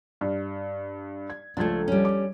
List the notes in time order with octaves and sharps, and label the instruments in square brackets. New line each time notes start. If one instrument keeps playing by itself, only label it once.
[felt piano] G2
G#6
[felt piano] C#2 F3 G#6 [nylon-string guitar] A3 D4
[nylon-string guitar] G3 C#4
[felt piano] D6